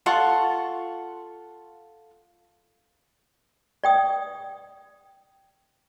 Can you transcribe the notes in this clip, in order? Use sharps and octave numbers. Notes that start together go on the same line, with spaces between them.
F4 A4 F#5 C#6
D5 G5 D#6